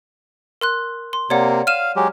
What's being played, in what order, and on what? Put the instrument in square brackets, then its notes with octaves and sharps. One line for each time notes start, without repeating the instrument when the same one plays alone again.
[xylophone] A#4 C6 F#6
C6
[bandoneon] C3 A#3 [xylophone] C#5 D5 F#5
[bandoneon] F5 [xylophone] F6 D#7 E7
[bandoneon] F#3 G#3 G4